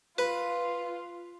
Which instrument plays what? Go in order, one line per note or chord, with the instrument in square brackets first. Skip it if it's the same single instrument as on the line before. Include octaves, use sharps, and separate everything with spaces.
[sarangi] F4 [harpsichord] B4